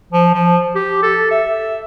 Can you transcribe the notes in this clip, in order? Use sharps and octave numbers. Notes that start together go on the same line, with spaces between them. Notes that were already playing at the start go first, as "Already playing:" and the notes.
F3
F3
G4
A4
E5